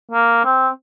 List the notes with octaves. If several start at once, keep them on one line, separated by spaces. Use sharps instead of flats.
A#3
C4